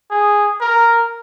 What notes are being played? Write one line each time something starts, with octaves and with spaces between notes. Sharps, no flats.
G#4
A#4